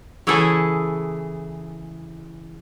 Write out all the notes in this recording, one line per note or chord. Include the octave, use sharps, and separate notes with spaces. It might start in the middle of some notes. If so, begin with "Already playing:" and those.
C#3 E3 E4 G#4 A4